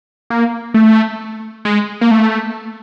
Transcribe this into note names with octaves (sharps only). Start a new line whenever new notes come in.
A#3
A3
G#3
A#3
A3